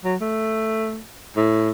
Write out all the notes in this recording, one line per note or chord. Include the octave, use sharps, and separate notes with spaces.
F#3
A3
A2